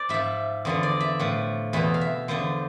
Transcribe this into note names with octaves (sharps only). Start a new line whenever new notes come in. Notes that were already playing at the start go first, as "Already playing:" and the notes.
Already playing: C5 D5
G#2 F3 E5
E2 D3 F3
D5
E5
A2 F3
E2 B2 E5
F5
E5
E2 D3 F3 C5